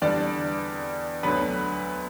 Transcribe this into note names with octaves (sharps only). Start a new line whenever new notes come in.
E2 D3 G3 D4 D5
D2 D3 F#3 B3 B4